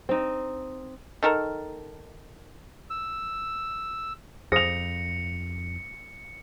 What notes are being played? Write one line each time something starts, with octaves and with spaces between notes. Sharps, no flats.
C4 D#4
D#3 A4 A#4
E6
F2 G#4 C5 D#6 A#6 C#7 F7